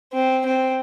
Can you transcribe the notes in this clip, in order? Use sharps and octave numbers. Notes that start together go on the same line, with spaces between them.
C4
C4